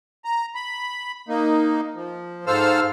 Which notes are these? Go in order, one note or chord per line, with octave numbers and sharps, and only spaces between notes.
A#5
B5
A#3 D#4
F3
G#2 A4 C5 F5 E6 F6